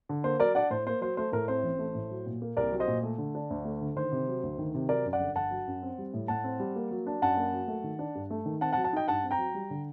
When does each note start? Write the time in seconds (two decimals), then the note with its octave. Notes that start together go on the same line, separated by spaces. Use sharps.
0.09 D3
0.24 A#3 C5
0.40 F#3 A#4 D5
0.55 D4 D5 F#5
0.70 A2 C5
0.87 A#3 C5
1.01 F#3 C5
1.17 A3 C5
1.32 A2 A#4
1.48 C4 C5
1.63 A1
1.79 A3
1.95 A2
2.11 F#3
2.26 A#2
2.42 A#3
2.57 C2 A#4 D5
2.72 F#3
2.80 C5 D#5
2.88 A#2
3.03 A3
3.18 D3
3.35 D4
3.50 D2
3.65 A3
3.81 D3
3.96 D#3 C5
4.12 C3
4.28 F#3
4.43 D2
4.58 D#3
4.74 C3
4.89 F#3 A#4 D5
5.05 F#2
5.13 D5 F#5
5.20 G1
5.36 G1 F#5 A5
5.51 F#3
5.67 F#2
5.82 C4
5.98 G3
6.14 A2
6.28 A2 F#5 A5
6.44 C4
6.60 G3
6.76 A#3
6.91 F#3
7.07 D4
7.22 F#2 F#5 A5
7.37 A#3
7.53 F#3
7.68 A3
7.84 D#3
7.99 D4
8.15 G2
8.30 A3
8.46 D#3
8.61 C4 F#5 A5
8.72 F#5 A5
8.77 F#3
8.84 F#5 A5
8.93 D#4 D#5 G5
9.08 G2 F#5 A5
9.24 C4
9.31 G5 A#5
9.38 F#3
9.54 G3
9.70 D3